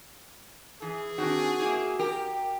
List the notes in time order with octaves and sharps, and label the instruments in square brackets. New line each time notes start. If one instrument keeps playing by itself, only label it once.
[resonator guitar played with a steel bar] E3 [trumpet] G#4
[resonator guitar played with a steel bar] D#3 C4 D4 [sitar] F#4
[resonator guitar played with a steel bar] A#3 E4 G4
[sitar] G4 [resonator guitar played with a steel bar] A#4